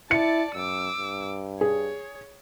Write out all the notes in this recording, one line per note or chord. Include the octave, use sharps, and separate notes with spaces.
E4 D5 A5 C#7
F#2 D6 E6
G2
G#4 C#5